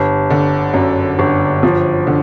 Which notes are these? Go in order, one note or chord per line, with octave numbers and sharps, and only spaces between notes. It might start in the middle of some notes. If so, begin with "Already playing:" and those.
Already playing: G1
D3
F#2
G1
F3
D3